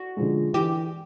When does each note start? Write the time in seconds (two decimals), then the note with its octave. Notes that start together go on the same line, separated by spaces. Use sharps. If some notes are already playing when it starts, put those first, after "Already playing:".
Already playing: F#4
0.17 D3 F3 G#3
0.53 E3 G4